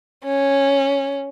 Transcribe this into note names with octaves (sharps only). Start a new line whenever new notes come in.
C#4